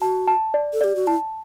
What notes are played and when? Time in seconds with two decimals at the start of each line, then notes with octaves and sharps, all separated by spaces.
0.01 F#4 A5
0.27 A5
0.54 D5
0.73 A4
0.81 G4 D5
0.96 F#4
1.07 E4 A5